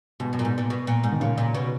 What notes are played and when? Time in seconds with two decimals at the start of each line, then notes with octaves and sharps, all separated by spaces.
0.20 G#2 B2
0.33 F#2
0.39 A#2
0.45 G#2
0.58 A#2
0.70 B2
0.87 A#2
1.04 G#2
1.12 D#3
1.20 A#2 C#3
1.38 A#2
1.55 B2